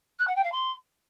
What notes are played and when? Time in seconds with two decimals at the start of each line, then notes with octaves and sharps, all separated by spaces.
0.19 F#6
0.27 F#5
0.36 G5
0.44 F5
0.52 C6